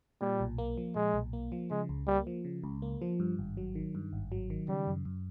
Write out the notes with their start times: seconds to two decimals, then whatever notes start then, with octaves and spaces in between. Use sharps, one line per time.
0.21 A#2 G3
0.40 B1
0.58 A#3
0.77 F3
0.95 A#2 G#3
1.14 B1
1.33 A#3
1.52 F3
1.70 C#3 G#3
1.89 C#2
2.07 G3 A#3
2.27 F3
2.45 C#3
2.64 C#2
2.82 A#3
3.02 F3
3.20 G2
3.39 G#1
3.57 F#3
3.75 D#3
3.95 G2
4.13 G#1
4.32 F#3
4.50 D#3
4.68 C#3 G3
4.87 F#2
5.05 F#2